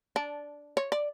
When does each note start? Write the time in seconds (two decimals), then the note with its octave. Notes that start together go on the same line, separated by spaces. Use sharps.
0.16 D4
0.77 C#5
0.92 D5